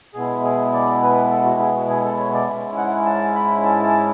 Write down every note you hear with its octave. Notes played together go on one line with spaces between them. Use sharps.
B2 G#3 B3 E4 G#4
G#4
D5
B4
A4
F#4
G#4
F#4
G#4
A4
C#5
D5
G#2 G#3 C#4 E4 E5
F#5
A5
B5
A5
A5